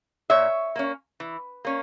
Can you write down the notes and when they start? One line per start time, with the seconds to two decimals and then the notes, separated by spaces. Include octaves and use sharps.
0.30 A#2 C#5 E5
0.76 A#3 C#4
1.20 E3
1.65 A#3 C#4